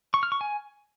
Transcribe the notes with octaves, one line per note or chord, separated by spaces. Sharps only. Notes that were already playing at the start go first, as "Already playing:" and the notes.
C#6
F6
C#6
G#5